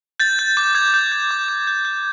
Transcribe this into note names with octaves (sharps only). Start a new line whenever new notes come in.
G6 A6
G6
D6 G6
D6 G#6
G6
G6
D6
D6
G6
G6